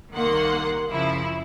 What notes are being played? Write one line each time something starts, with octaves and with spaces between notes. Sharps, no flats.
C2 D#3 A#3 F#5 C6
F#2 C#3 F3 E4